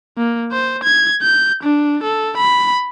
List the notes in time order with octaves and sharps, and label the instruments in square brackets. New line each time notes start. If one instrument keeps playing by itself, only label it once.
[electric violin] A#3
C5
G#6
G6
D4
A4
B5